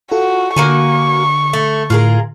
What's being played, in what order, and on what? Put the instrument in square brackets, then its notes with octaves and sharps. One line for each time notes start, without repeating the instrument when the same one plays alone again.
[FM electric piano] F4 A4 [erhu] F#4
[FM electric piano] D3 [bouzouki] A#3 F#4 G#5 [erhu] C#6
[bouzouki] A3
[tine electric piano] A2 [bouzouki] F4 G#4 A#4